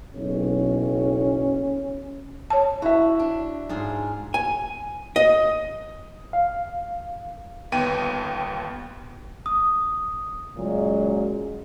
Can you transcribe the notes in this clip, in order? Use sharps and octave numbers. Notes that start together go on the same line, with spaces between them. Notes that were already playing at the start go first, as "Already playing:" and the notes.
F#1 B1 C#4
C#5 A5
E4 F#4 E5
D4
G#2 F4 G#4
G#5
D#5
F5
G1 D#2 B3 G5 D#7
D#6
A#2 C#3 F#3 G#3